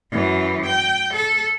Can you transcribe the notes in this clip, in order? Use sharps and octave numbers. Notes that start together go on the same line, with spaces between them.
F#2 E3
G5
A4